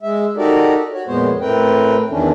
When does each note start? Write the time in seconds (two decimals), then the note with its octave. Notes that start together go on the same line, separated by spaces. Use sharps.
0.03 G#3 E5
0.37 D#4 F#4 G4 A4 A#4 D5
0.93 F#4 C#5
1.08 F2 A#2 G#3 B3 C5 C#5
1.40 A2 A3 C4 A#4 B4 G5
2.11 E2 D#3 E3 C#4 D4